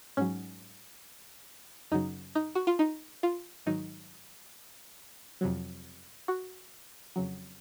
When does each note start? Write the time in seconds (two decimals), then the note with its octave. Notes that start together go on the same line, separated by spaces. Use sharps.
0.17 G#2 F#3 C#4
1.92 F#2 C#3 F#3 D#4
2.35 D#4
2.55 F#4
2.67 F4
2.79 D#4
3.23 F4
3.66 G#2 D#3 F#3 D#4
5.41 F2 C3 F#3
6.28 F#4
7.16 F2 C#3 F#3